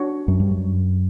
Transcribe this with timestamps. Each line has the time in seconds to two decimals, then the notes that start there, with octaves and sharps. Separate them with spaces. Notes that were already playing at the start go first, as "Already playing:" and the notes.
Already playing: D4 F#4 C#5
0.28 F#2
0.40 G2
0.51 F#2